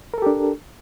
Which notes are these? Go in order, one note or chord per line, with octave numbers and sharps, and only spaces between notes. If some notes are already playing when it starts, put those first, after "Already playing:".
D4 G4 A4 A#4